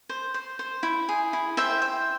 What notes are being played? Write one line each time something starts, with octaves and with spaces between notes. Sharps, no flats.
C5
C5
C5
E4
G#4
E4
C5 E5 G5
C5